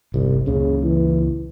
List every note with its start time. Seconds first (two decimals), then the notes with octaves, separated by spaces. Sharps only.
0.14 G1 C2 C3
0.46 C#2 A#2 C#3
0.83 E3